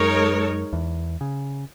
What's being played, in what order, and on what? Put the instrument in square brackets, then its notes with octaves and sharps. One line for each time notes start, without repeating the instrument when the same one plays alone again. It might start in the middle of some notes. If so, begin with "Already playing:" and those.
Already playing: [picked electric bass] F#2 [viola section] G#3 D#4 A#4 C#5
[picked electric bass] E2
C#3